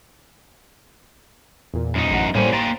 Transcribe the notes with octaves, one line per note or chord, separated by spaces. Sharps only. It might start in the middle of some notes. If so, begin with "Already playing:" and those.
E2 A#2
F#2 D#4
A1 F#5
A2 G3 A#3 C5 C#5 G#5
A#3 G5 A#5 C6 A6